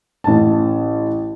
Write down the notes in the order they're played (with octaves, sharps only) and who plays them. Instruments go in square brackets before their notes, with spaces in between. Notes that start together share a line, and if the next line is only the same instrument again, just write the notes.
[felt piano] A1 A5